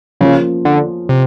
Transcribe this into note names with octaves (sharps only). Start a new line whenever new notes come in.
C#3 F3 A#3 C#4 F4
D3
C3